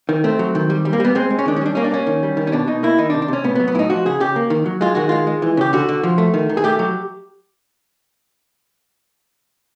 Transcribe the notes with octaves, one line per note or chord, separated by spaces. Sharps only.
D#3
A3 C4
F#3
D#3
G3
G3
A#3
G3 B3
G#3 C4
G#3
C#4
D#3 D4
C#4
G3 D4
A#3 C#4
D4
A#3 C#4
D#3
G3
D#3
C#4
B2 D4
B2 D#4
A#3 E4
D#3 D#4
D4
C3
D4
C3 C#4
A2 B3
B3
F#3
B3
A2 D#4 E4
F3 F#4
C#3 G#4
C#3 G4
A#3
D#3
F#3
G#3 F4
D#3 F#4
G#3 F4
G#3
E3
C#3 G4
D3 F#4
D3
F3
A3
D#3
D#3
G#4
A3 G4
F#3